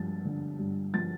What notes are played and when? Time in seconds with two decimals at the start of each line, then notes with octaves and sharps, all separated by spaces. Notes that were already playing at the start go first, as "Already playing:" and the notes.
Already playing: G2 F3 A6
0.25 D3
0.59 G2
0.94 F3 A6